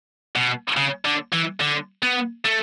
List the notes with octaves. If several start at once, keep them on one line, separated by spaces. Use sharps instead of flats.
B2
C#3
D3
E3
D3
B3
A3